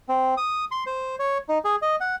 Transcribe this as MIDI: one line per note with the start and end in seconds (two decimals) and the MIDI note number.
0.09 0.35 60
0.37 0.65 87
0.71 0.84 84
0.86 1.15 72
1.19 1.38 73
1.49 1.58 63
1.65 1.76 68
1.82 1.96 75
2.00 2.16 78